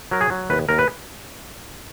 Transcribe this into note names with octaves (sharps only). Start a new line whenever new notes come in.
F#3 A#4
G#4
F#3
D#2 B4
D#2 A#4
B4